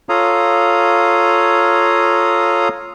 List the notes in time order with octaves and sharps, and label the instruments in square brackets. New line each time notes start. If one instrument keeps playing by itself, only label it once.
[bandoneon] F4 A4 C#5 F5 A#5 D#6